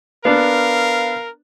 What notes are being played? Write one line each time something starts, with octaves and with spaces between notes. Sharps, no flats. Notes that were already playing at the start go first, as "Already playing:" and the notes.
B3 D4 A#4 F5